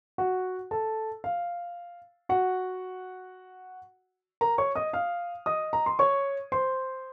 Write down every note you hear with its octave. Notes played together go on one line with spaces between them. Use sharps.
F#4 F#5
A4 A5
F5
F#4 F#5
A#4 A#5
C#5 C#6
D#5 D#6
F5 F6
D#5 D#6
A#5
C6
C#5 C#6
C5 C6